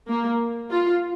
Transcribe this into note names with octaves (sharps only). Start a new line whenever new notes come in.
A#3
F4